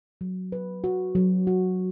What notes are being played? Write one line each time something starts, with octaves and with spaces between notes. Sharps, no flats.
F#3
B4
F#4
F#3
F#4